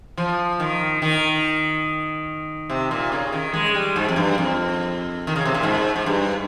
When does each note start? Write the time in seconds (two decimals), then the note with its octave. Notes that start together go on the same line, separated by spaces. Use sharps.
0.17 F3
0.60 D#3
1.02 D#3
2.70 C3
2.91 A#2
3.12 C#3
3.32 D#3
3.53 G#3
3.75 G3
3.96 G#2
4.08 F2
4.16 G2
4.38 F2
5.27 D#3
5.36 C#3
5.45 C3
5.54 A#2
5.63 G#2
5.96 G#2
6.06 G2